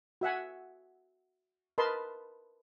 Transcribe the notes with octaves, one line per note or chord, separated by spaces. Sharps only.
F#4 E5 F#5 G#5
A#4 B4 D#5 A5 B5 C6